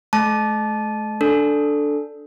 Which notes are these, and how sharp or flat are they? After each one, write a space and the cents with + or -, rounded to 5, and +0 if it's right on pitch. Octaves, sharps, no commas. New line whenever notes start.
A3 -45 A5 -20
D4 +0 A4 +0